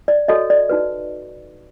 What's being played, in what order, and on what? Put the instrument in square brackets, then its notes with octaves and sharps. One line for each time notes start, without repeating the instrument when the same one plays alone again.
[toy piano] D5
F#4 A4 C#5 D#5
D5
D#4 F#4 B4